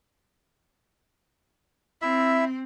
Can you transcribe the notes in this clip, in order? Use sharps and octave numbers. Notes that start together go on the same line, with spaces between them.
C4 E4 E5